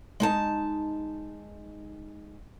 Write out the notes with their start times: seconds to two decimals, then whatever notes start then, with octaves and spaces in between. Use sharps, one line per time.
0.20 G#3 D#4 A5